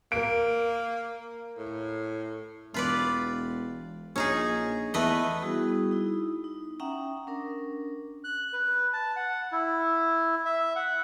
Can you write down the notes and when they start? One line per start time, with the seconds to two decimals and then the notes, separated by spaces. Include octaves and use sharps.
0.12 A#3 A#4 D7
1.57 A2
2.74 E1 F4 B4 D5
4.16 A#1 C#4 D#4 G#4
4.94 E2 A3 B4 D#5
5.42 G3 B3 E4 F#4 G#4 D#6
5.91 D#4 E4
6.44 D#4
6.80 C#4 E5 F#5 G5 A#5 D#6
7.27 C#4 D4 A#4
8.24 F#6
8.53 B4
8.93 A5
9.16 F#5
9.52 E4
10.45 E5
10.76 F#5